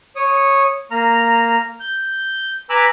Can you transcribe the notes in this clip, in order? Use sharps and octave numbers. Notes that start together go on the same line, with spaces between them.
C#5 D#6
A#3 A#5 F6
G6
B4 G#5 A#5 B5 D6 E6